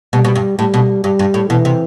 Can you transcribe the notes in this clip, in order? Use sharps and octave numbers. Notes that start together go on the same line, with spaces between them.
B2 G3
B2
G2
A2 G3
B2
G2 G3
G2
A2
B2 E3
C3